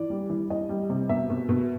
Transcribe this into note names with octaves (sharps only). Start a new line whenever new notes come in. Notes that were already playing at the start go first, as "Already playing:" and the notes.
Already playing: E3 D5
G3
E3
E3 D#5
G3
C3
B2 E5
B2
B2